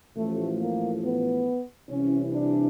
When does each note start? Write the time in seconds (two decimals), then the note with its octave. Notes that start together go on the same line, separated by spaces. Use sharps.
0.15 A1 A2 F3 A3
0.59 A#3
1.01 B3
1.87 C2 C3 E3 C#4
2.30 D4